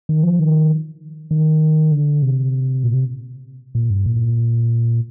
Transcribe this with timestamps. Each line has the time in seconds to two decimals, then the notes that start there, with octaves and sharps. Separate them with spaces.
0.09 D#3
0.23 F3
0.39 D#3
1.31 D#3
1.92 D3
2.22 C3
2.84 A#2
2.94 C3
3.75 A#2
3.90 G2
4.06 A#2